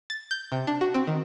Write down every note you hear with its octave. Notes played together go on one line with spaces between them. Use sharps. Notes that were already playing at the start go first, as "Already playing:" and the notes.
A6
G6
C3
D4
F#4
C4
D#3